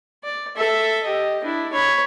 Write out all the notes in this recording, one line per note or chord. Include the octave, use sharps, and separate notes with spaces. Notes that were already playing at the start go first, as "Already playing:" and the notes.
D5
A4 E5
G4 D#5
D4 E4
C#5 B5